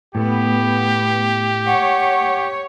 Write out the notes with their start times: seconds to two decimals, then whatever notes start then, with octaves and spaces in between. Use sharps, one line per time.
0.15 A2 A3 B3 G4
1.67 C#5 F#5